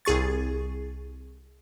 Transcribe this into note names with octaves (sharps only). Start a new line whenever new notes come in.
C2 G#4 C#6 A6